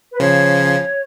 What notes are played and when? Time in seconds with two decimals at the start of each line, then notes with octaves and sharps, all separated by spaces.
0.12 B4
0.20 C#3 F3 C#5